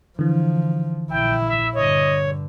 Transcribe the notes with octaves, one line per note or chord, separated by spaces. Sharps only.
D3 E3 F3
A#1 E4 G5
E5
G2 D3 C#5 D#5